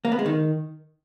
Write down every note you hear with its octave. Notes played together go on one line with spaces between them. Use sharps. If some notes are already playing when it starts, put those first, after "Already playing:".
A#3
B3
G#3
D#3